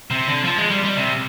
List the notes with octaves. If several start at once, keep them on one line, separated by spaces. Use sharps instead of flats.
C3
D3
F3
G#3
G3
G3
C3